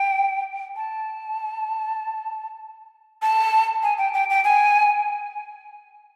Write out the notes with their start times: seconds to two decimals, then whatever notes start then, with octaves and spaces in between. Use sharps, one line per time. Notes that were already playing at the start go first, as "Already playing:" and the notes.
Already playing: G5
0.76 A5
3.22 A5
3.83 G#5
3.98 G5
4.14 G5
4.30 G5
4.44 G#5